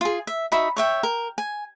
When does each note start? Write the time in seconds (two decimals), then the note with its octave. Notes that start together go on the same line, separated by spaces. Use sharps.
0.01 F4 G#4
0.27 E5
0.52 D#4 F#4 E5 B5
0.77 C#5 E5 G5
1.03 A#4
1.38 G#5